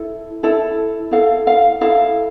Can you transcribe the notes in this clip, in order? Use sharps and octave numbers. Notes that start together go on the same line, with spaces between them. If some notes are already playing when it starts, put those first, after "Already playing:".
Already playing: E4 A4
E4 A4
E4 A4 F5
F5
E4 A4 F5